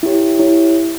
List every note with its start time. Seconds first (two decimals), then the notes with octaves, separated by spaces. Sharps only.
0.03 E4 G4 C#5
0.39 E4 G4 C#5